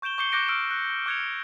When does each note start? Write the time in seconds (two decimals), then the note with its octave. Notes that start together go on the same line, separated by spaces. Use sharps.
0.02 C#6 G6 D7 E7 G7
0.18 C#6 D6 G6 C7 C#7 G7
0.32 D6 F#6 G6 A#6 C#7 D7
0.49 D6 E6 F6 D7
0.71 F#6
1.06 D6 F#6 G#6 C#7 F7